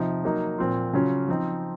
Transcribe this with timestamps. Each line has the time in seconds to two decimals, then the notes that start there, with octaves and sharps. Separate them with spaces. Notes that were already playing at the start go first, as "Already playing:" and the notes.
Already playing: C3 F3 D#4
0.23 F#3 A#3 D#4
0.58 A#2 F3 C4 F4
0.93 C#3 F#3 C#4 F4
1.28 F3 C4 D#4